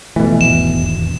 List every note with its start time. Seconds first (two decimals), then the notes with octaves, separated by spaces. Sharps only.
0.16 B2 E3 F3 A3
0.41 D#1 G#1 E2 E7